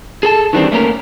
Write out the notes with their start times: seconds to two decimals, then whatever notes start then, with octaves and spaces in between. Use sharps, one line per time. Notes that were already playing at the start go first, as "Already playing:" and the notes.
0.23 G#4 A4 A5
0.53 D#3 E3 G3 C4 D4
0.72 A3 A#3 C#4 A#4